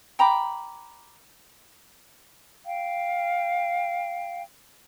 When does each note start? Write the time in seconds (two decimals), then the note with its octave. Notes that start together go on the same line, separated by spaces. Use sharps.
0.19 G5 A#5 B5 D6
2.65 F5 G5